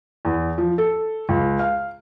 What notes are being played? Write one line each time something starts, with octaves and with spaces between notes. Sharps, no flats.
E2
F3
A4
C#2
F5